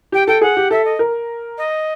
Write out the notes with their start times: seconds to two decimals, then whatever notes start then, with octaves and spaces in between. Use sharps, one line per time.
0.12 G4 G5
0.27 A4 G5
0.41 G#4 F#5
0.57 G4
0.71 A4 E5
0.85 D#5
0.99 A#4
1.57 D#5